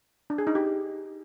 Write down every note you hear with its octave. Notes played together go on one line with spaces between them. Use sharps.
D4
G#4
D#4
G4